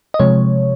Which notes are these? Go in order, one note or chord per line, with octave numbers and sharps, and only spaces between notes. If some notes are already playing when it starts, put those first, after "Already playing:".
D#5
C3 F3 G#3 C#5